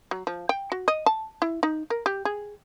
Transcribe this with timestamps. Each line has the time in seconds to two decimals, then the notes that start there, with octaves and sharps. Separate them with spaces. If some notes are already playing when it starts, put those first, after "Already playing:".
0.11 F#3
0.27 F3
0.49 G5
0.72 F#4
0.88 D#5
1.06 A5
1.42 E4
1.63 D#4
1.90 A#4
2.06 G4
2.25 G#4